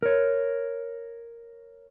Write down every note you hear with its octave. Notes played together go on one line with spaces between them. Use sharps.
A#4 C#5